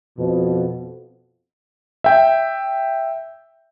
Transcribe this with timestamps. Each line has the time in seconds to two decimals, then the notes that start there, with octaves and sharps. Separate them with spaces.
0.18 F2 B2
2.04 E5 G5